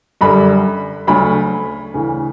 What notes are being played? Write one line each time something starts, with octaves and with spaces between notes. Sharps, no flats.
F#2 D3 G3 B5
D2 C#3 F#3 A3 B5
D2 C#3 E3